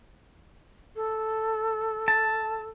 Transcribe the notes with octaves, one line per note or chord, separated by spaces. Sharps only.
A4
A5